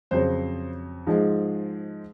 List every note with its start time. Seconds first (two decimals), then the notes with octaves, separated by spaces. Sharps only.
0.11 F2 C#3 F#3 C5
1.07 G#2 F3 G#3